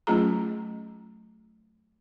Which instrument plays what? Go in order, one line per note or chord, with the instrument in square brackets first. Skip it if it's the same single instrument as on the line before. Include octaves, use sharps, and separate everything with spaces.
[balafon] F#3 A3 C#4 F4 G#4 A#5